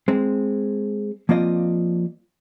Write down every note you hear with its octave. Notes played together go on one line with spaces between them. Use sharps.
G#3 C4
F3 A#3 C4 F4 D5 D#5